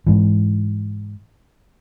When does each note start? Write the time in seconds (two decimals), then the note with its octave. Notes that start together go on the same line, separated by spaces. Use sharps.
0.07 G#2 E3